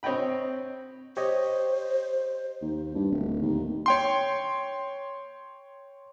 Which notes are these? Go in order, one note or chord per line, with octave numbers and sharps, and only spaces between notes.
C4 C#5 D#5 G5 B5
G4 C5 C#5 D#5
D#2
G2
D1
D#2
C#5 G5 C6